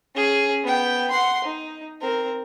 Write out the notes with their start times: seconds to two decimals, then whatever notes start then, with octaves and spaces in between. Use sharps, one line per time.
0.15 C#4 G#4
0.63 B3 G5
1.11 F#5 C6
1.44 D#4
2.01 C4 A#4